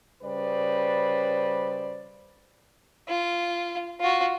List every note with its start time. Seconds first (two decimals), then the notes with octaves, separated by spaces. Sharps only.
0.23 C#3 G3 B4 C5 D5
3.08 F4
4.00 F4 F#4